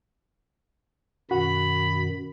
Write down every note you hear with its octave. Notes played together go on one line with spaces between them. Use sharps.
F#2 B2 D#3 F#4 B5